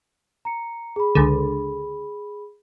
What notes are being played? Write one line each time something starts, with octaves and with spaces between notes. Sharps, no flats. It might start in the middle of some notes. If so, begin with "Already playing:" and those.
A#5 C#7
G#4 B5
C#2 D3